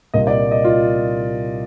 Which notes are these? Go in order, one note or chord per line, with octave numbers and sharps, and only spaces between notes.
C2 A#2 G3 A#3 D#5
D5
D#5
F4